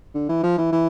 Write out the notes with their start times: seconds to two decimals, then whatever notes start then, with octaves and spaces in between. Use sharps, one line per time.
0.14 D3
0.29 E3
0.43 F3
0.58 E3
0.72 E3